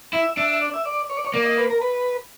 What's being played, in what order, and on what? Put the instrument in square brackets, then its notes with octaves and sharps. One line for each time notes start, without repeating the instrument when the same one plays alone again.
[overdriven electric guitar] E4 [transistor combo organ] E5
[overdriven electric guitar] D4 [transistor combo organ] E5
[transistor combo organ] E5
D5
E5
D5
C#5
D5
C#5
[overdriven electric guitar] A#3 [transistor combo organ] D5
[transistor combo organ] D#5
B4
A#4
B4